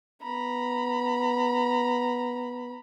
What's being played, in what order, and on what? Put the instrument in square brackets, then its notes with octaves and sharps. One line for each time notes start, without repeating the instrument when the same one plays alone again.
[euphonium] B3 [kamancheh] A#5 B5